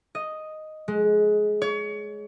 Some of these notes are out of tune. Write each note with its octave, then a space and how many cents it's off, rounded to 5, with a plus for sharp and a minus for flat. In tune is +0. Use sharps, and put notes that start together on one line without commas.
D#5 +0
G#3 +20
C#5 +30